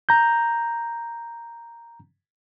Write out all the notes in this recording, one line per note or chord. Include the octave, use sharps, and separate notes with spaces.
A#5 G6